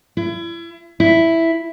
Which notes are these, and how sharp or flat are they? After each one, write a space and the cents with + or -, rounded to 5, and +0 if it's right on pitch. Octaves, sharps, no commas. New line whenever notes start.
E4 +35
E4 +0